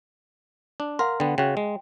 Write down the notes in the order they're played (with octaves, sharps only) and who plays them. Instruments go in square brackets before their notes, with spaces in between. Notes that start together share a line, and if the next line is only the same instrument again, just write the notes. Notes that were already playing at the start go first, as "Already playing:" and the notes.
[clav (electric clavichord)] D4
[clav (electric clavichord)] A#4 [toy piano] F5 F#5 C6
[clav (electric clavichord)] D3 B3 [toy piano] G5
[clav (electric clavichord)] C#3 F#4 [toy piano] G5
[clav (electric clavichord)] G#3